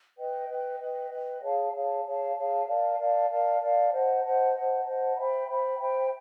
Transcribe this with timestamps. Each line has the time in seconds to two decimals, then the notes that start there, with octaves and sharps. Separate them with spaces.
0.16 B4 D#5 G5
0.48 B4 D#5 G5
0.79 B4 D#5 G5
1.11 B4 D#5 G5
1.41 G#4 C#5 F5 A5
1.72 G#4 C#5 F5 A5
2.05 G#4 C#5 F5 A5
2.36 G#4 C#5 F5 A5
2.67 A#4 D5 F5 A5
2.98 A#4 D5 F5 A5
3.29 A#4 D5 F5 A5
3.60 A#4 D5 F5 A5
3.91 C5 D#5 F#5 A5
4.23 C5 D#5 F#5 A5
4.54 C5 D#5 F#5 A5
4.84 C5 D#5 F#5 A5
5.16 C5 E5 G5 B5
5.47 C5 E5 G5 B5
5.78 C5 E5 G5 B5